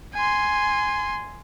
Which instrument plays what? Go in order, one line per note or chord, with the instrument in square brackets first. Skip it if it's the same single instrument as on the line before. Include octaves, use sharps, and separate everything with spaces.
[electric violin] G#5 C6